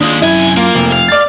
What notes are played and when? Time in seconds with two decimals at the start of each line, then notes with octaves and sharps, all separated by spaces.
0.01 D#2 G#3 D4 F4 D#6
0.22 C2 F#2 E4 G#5
0.57 A#3 F4
0.75 F1 F3 A3 C4
0.93 F5
1.08 D5 A6